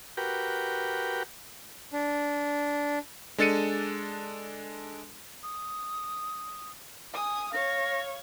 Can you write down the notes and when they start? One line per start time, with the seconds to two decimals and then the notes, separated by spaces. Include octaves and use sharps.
0.17 F#4 G4 A#4 B4 G5
1.93 D4
3.38 G#3 D4 A4 A6 C#7 D#7
5.43 D#6
7.13 G#5 D#6
7.53 C#5 F5 A#6